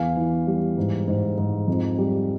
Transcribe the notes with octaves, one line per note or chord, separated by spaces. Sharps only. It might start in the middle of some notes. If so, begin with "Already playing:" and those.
Already playing: E2 F5 G#5
E3
G3
G#2
G#2
G#2
F2
G3